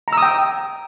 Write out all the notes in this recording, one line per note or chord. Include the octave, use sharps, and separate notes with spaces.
G5 A#5 D#6 E6